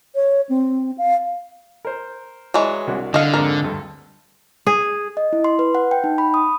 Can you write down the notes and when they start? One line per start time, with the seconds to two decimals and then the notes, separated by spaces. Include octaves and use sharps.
0.15 C#5
0.49 C4
0.98 F5
1.85 A#4 C5
2.54 E3 F#3 G#3 D5
2.87 C2 D4 F#4
3.14 D3 D#5 F5
3.34 F2 G#2 A#4
3.64 D2 G2 A4
4.67 G#4
5.17 D#5
5.33 E4
5.44 C6
5.59 B4
5.75 F#5
5.91 G5
6.04 D#4
6.18 B5
6.34 D#6